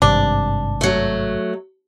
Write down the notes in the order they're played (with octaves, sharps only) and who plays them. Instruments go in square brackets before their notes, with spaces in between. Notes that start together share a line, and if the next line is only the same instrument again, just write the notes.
[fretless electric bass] G#1 G2 C3 [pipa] D4
[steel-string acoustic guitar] F#3 A3